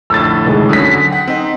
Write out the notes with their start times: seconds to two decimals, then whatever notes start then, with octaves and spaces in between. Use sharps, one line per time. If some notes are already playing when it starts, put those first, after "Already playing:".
0.10 F2 A2 D3 E6 A6
0.47 D#2 G#3
0.69 D3 F#3 C#4 D#6 B6
1.11 F#5 G5
1.28 C4 D#4 D#5